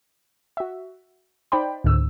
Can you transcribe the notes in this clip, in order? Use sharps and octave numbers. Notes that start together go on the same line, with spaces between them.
F#4 E5
D#4 C5 D5 G5 B5
C#2 G#2 D3 E6